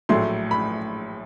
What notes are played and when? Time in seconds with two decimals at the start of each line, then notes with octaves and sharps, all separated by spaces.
0.09 A#1 A2 F#3 A3 C6
0.51 B5